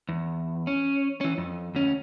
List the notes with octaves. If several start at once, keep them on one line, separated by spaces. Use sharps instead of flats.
E2
C#4
E3 C#4
F2
D2 C#4